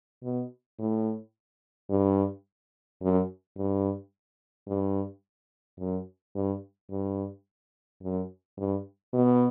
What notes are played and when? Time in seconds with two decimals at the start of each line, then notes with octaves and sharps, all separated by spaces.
0.23 B2
0.79 A2
1.90 G2
3.02 F#2
3.57 G2
4.68 G2
5.80 F#2
6.35 G2
6.91 G2
8.03 F#2
8.58 G2
9.13 B2